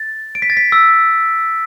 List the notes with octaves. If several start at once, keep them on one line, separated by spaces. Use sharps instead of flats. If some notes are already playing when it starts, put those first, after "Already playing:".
Already playing: A6
D7
B6
A6
B6
E6